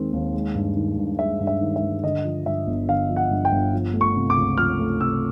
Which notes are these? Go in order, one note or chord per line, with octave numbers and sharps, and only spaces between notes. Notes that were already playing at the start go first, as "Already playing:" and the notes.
Already playing: D#2 D#3 G#3 C4
D#2
G#3
G2
D#3
G2
G#3 E5
G2
E5
D#3
E5
G2
D3 D#5
F3
G2 E5
G1
D3 F5
F3
F#5
G2
G5
G1
F3
A3
C#6
C3
D6
C#2
F3 F6
A3
C3 E6